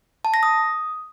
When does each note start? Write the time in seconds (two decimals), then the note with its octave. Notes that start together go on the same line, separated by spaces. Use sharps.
0.25 A5
0.34 A#6
0.43 D#6